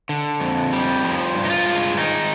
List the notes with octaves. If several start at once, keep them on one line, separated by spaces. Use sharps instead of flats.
D3
F2
G3
F3
G2
D#4
F4
G#3
D#3 D#4